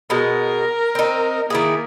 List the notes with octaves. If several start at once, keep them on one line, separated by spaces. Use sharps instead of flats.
B2 G#3 A#4
C4 D#4
D#3 A#3 E4 G#4